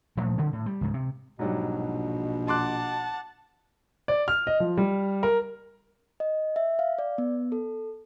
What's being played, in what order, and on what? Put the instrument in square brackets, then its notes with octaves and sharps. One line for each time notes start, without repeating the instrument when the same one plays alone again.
[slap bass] A#2 F3 A3
C#3 F3 G3 C4
A2
G3
C#2 G#2
C3
[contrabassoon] A#1 [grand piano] G#2 F#3 G3 [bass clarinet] B2
[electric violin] F#5 A5 [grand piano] C6 D6 F#6
[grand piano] D5
F6
D#5
F3
G3
A#4
[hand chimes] D#5
E5
F5
D5
B3
A4